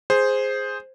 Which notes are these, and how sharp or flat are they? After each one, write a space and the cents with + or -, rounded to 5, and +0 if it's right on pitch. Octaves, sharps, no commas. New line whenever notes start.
G#4 +0 C5 +0